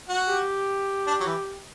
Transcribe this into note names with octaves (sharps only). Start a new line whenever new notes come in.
F#4
G4
D4
F#3
E3